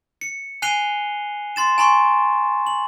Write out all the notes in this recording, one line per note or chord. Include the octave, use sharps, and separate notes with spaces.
C#7
G#5 F#6 C7 D#7 F7 G7
C6 A6 E7
G#5 A#5 C6 C#6
F#7